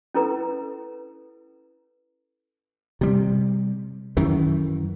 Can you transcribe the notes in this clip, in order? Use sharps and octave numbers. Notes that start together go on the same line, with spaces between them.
C#4 E4 A4 B4 A#5
C3 G3
F#2 D#3 E3